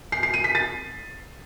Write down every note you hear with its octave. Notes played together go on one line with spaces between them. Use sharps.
C7
C7
D#7
B6
A6